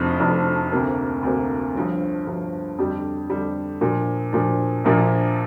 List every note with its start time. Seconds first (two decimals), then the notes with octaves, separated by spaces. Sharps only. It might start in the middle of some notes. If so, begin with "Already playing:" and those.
Already playing: F1 F2 F3 D4
0.20 F1 F2 F3 D4
0.72 D2 C3 A#3
1.23 D2 C3 A#3
1.75 G1 G2 F3
2.27 G1 G2 F3
2.78 F2 D3 G3 D4 G4
3.30 F2 D3 G3 D4 G4
3.81 A#2 F3 D4
4.33 A#2 F3 D4
4.84 A#1 A#2 F3 A#3 D4